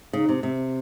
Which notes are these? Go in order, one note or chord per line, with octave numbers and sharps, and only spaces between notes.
C#3 D#4
C3
C3